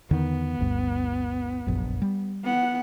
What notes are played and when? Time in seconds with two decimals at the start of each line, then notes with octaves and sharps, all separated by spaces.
0.11 E2 D3 D#3 B3
0.59 G1 D2 G2
1.67 F1 A#1 F#2
2.02 G3
2.44 B3 F#5